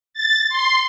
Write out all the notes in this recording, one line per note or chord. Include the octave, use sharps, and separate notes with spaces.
A6
C6